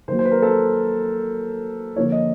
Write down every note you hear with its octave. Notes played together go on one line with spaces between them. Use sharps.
D#3 F#3 A#3 C5
C5
B4
A#4
A4
D3 F3 A#3 C#5
D#5